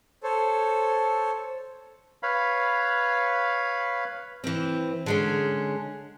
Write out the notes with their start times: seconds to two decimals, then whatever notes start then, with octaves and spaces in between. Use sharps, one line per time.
0.23 A4 C5 C#5
2.23 B4 C#5 F5 B5
4.44 E3 C4
5.06 D3 G#3 C#4